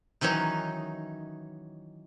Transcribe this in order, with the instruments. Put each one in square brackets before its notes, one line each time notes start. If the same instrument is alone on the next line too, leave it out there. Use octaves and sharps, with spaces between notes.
[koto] D#3 E3 F#3 C#4 D#4